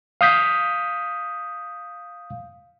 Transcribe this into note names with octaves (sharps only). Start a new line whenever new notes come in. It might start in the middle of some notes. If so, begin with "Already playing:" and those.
F5 D#6 G6 B6